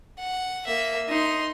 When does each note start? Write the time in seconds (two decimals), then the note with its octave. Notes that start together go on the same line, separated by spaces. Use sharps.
0.19 F#5
0.67 A#3 E5
1.09 D#4 C6